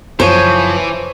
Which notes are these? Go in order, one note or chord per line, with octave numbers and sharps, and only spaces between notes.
F#2 C#3 E3 F3 C5 C#5